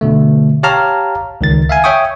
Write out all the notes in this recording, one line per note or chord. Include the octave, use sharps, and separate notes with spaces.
B2 D3 A3
G4 C#5 F5 A5 A#5 F6
C#2 D#3 A6
E5 F5 G#5
C#5 E5 G5 C#6 D#6